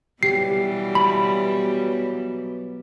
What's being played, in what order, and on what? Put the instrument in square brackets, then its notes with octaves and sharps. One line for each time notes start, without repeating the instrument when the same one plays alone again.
[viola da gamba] B2 E3 G3 [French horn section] F#3 B3 [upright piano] G4 [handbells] C7
[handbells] B5